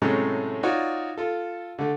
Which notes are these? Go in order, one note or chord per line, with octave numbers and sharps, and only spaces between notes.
A2 C3 F#3 G#3 A3 C#4
D#4 F4 F#4 C#5 D5
F4 A4
D3 A3